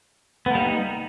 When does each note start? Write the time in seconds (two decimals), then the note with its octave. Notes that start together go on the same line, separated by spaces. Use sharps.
0.46 B3
0.51 A#3
0.55 G3
0.60 D#4